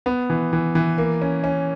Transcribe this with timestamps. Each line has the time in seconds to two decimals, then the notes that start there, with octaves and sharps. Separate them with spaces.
0.06 B3
0.30 E3
0.53 E3
0.75 E3
0.98 A#3
1.22 C#4
1.44 C#4